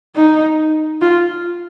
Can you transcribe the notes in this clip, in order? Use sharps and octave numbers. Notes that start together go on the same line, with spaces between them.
D#4
F4